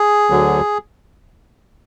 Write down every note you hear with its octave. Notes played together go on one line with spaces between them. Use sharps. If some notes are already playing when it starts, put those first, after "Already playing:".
Already playing: G#4
D2 D3 F#3